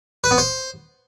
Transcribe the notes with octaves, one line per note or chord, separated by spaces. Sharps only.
B4
B3
C5